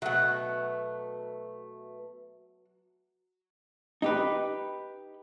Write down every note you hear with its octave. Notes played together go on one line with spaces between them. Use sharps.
B2 F#3 A3 F#5
D#4 G4 B4